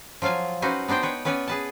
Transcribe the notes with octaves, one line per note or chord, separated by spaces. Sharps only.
F3 F#3 F4 F5 G#5
C#4 D#4 F#4 B4 C5
B3 D4 D#4 C5 G5
B4 C#5 G5
B3 C#4 B4 C#5 D5 G#5
G#4 B4 A5